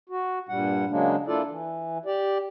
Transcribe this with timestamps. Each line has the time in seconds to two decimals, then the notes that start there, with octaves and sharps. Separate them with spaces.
0.10 F#4
0.49 G2 A#2 G3 F#5
0.90 C#3 F#3 G#3 A#3 D4
1.27 A#3 D4 E4 F4 A4 D5
1.48 E3
2.06 G4 D5